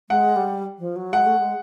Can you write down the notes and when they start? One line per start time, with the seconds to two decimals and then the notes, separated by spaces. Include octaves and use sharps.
0.10 G#3 F#5
0.36 G3
0.79 F3
0.96 F#3
1.13 G#3 F#5
1.26 A3
1.39 G#3